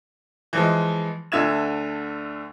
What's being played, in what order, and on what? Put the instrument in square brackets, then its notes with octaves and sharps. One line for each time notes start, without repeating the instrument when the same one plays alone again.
[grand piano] E3 F3 G#3
D2 D3 E5 G#6 E7